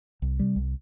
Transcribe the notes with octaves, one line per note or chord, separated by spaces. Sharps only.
C2
C3 G3
C2